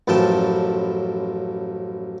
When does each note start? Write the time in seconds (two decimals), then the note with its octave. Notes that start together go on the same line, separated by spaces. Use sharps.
0.08 A1 F#2 A2 F3 G5 A5